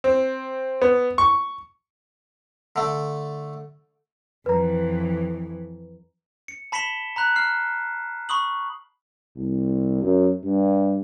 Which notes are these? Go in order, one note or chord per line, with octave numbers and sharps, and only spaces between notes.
C4
B3
C#6
D3 A3
F2 E3 B4 A#5
C#7
A5 B5 B6 C#7 E7 G7
A#5 B5 F#6
F6 C7
B5 C#6 D#6 F#7
C2
F#2
G2